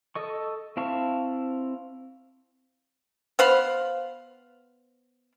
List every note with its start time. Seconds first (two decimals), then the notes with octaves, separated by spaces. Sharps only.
0.15 A4 D#5 C#6
0.77 C4 E4 F5 A5 C#6
3.39 B3 C5 F5 B5